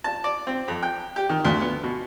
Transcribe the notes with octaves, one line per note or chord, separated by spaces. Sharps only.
A5
D5
C4
F2
G5
G4
D#3
D2
B3
B2